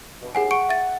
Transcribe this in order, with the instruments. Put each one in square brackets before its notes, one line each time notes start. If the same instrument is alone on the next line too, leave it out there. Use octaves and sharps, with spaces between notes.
[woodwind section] G2 B2
[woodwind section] D#2 [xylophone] G#4 F#5 G#5
[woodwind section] F#5 [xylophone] C#6 C#7 D7
[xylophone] E5 A6